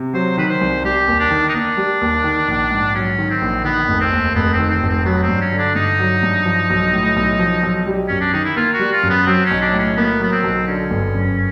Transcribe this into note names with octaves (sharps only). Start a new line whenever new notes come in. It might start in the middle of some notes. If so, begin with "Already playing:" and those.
Already playing: C3
F#3 C5
D#3 B4
C5
C2
G3 G4
D#2
D4
D#3
D#4
A#3 D4
G3
D#2
D#3
A#1
G#2
F#3 C#4
D#3
C4
A#1
D#3 B3
F1
C4
D#2
F1 B3
C4
D#3
C4
F1
C4
F#3 B3
C4
G2
C#4
D3
D4
G2 D#4
F#3
G2
F3
B1
A2
B1
F3
B1
G3
F#2 C#4
D4
D#3 D#4
E4
A#3 F4
F#4
G3
F4
F#2
B3
F#3 C4
C#4
B1
D4
A2
C#4
A#3 B3
F#3 B3
C4
B1
D3 C#4
G1
F#2